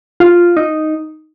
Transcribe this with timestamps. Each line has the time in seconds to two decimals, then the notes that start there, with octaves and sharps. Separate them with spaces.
0.20 F4
0.57 D#4